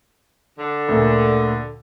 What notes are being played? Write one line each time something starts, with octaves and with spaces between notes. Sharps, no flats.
D3
D2 A#2